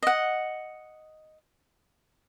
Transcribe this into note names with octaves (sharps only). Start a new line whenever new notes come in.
D#5 F#5